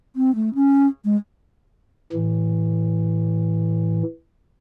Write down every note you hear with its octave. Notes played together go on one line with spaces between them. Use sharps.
C4
A3
C#4
G#3
A2 E3